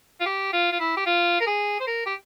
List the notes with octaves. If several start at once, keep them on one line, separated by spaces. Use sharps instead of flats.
F4
G4
F4
F4
E4
G4
F4
A#4
G#4
C5
A#4
G4